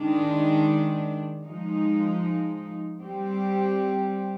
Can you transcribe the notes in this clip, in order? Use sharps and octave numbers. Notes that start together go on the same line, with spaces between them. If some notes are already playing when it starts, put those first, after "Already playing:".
Already playing: D#3 G#3 D4
F3 G#3 D#4
G3 C4 G4